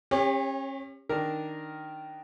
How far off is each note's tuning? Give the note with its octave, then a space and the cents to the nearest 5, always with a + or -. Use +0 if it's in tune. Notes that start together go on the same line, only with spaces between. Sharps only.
C#4 -35 G4 +35 C#5 +0
D#3 +0 D4 +0 A#4 +0